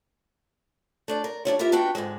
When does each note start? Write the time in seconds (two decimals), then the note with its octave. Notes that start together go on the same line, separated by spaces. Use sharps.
1.08 A3 D4 D5
1.24 A#4
1.45 G3 D4 F4 C#5
1.59 E4 F4 G4 A#4 E5
1.72 B3 D4 D#4 F#4 G5
1.95 G#2 D3 F#3 G#3